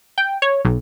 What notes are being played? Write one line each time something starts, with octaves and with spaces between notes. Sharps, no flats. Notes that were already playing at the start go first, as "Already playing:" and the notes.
G5
C#5
B1